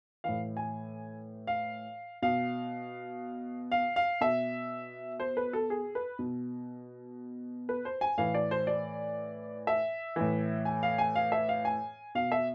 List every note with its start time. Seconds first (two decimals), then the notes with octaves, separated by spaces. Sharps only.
0.24 A2 E3 F5
0.57 G#5
1.47 F5
2.22 B2 F5
3.72 F5
3.96 F5
4.21 B2 E5
5.20 C5
5.37 B4
5.53 A4
5.70 G#4
5.95 B4
6.19 B2
7.69 B4
7.85 C5
8.01 G#5
8.18 A2 E3 F5
8.34 D5
8.51 C5
8.67 D5
9.67 E5
10.16 A2 E3
10.65 G#5
10.83 F5
10.98 G#5
11.15 F5
11.32 E5
11.49 F5
11.65 G#5
12.15 B2 F5
12.32 E5